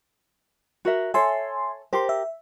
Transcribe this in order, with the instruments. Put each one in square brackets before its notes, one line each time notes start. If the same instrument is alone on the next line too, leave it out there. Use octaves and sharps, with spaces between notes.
[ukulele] F#4 A#4 E5
[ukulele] A4 C#5 [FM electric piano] E5 G#5 C6
[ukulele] G4 A#4 [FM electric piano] C5 C6
[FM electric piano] E5